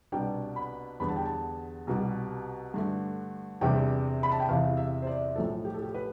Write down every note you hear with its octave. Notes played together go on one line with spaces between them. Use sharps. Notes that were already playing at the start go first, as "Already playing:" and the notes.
C2 B2 B3 D4 G5
B5
E2 D3 G3 B3 B5
A5
G5
A5
C2 B2 G3
G2 D3 A3
E2 C3 G3 D4 G5
B5
A5
G5
E2 C3 E3 F5
E5
C5
D5
B1 A2 F3 A4
G4
A4
G4
B4